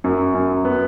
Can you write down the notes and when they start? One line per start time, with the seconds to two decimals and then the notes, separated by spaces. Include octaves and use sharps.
0.04 F#2
0.34 F#2
0.65 B3